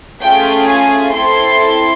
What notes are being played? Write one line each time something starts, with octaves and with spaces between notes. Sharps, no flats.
A3 C#4 F4 G#4 G5
G#5
C4 E4 A4 C6